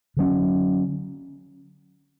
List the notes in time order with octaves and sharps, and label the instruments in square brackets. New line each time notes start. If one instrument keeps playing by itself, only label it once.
[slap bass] D3 F#3 C#4